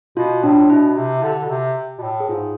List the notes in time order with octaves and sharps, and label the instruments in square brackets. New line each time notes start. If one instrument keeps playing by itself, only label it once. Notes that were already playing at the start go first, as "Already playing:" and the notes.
[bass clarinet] B2 [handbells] F4
[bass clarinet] A2 [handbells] D4
[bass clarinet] B2 [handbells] E4
[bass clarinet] C3
D3
B2
C3
B2
A2
[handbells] G#4
[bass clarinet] G#2 [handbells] F4